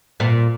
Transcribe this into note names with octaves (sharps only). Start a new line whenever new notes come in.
A#2